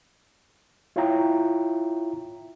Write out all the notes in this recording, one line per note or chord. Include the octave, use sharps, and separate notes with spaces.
E4 F4 C#5 E5 G5 A#5